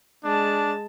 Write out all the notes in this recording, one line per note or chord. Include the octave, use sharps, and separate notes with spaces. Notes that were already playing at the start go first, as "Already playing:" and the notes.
G#3 D4 A5